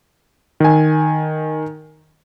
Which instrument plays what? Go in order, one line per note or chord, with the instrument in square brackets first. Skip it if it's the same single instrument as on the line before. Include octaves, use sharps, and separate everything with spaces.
[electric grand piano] D#3 G#5